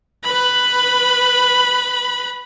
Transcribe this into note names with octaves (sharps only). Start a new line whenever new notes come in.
B4 B5